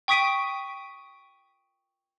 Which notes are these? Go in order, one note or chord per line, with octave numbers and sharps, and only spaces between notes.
G5 C#6 D#6 B6 D7 D#7